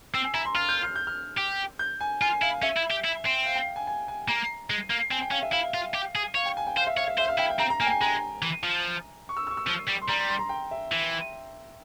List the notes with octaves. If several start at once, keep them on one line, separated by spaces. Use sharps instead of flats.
C4 E6
G#5
E4 A#5
C6
F4 F6
G6
F6
G6
F6
G4
G6
G#5
F4 G#5
E4 F5
C#4 E5
E4
G4
E4
C4
F5
G5
G#5
G#5
G#5
A#3 A#5
G#3
A#3
C4 G#5
G5
C#4 F5
E5
E4 F5
F4
G4
G#4
C#5 F5
G5
G#5
G5
C5 F5
E5
C#5 F5
E5
C5 E5
F5
E4 G5
G5
C4 A#5
A#5
A#3 G#5
G5
G#5
G#3 A#5
E3
F3
C#6
E6
E6
C#6
E6
F3
G3
C6
G3 A#5
C6
C6
A#5
G5
E5
E3